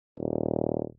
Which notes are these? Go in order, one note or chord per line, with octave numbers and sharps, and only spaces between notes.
D#1